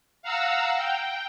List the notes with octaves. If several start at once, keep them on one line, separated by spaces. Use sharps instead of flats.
F5 F#5 A#5 E6
G5